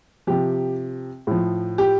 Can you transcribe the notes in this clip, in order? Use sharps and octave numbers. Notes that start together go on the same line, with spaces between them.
C3 F3 G4
A2 F3
G4